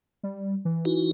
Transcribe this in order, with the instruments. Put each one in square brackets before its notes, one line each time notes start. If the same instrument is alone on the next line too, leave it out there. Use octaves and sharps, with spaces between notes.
[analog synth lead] G3
E3
[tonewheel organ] D#4 E4 F#4